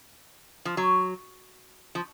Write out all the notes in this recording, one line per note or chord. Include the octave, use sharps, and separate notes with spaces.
F3
F#3
F3